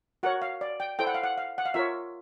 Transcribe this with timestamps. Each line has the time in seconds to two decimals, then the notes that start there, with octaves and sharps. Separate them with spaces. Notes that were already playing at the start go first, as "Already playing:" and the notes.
0.23 F#4 A#4 C#5 F#5
0.42 F5
0.61 D5
0.80 G5
0.99 E4 A4 C5 G5
1.07 F#5
1.14 F5
1.24 F#5
1.38 F5
1.58 F#5
1.66 F5
1.74 F4 A#4 C#5 E5